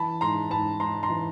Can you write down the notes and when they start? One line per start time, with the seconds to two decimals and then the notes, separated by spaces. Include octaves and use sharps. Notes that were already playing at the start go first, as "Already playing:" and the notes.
Already playing: E3 A5 B5
0.21 G#2 A#5 C6
0.51 G#2 A5 B5
0.80 G#2 A#5 C6
1.03 A#5 C6
1.10 E3